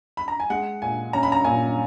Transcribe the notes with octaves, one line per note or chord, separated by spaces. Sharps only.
B5
A#5
G#5
G#3 F#5
A#2 G#5
C#4 A#5
B5
A#5
A#2 G#5